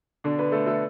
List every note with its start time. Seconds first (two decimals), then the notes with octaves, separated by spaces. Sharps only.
0.24 B2 D3 D4
0.38 B3 B4
0.52 A3 A4
0.66 A3 A4